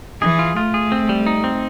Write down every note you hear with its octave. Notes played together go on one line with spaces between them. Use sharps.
E3 G#4
F4
A3 F4
G#4
C4
G3
D#4
C4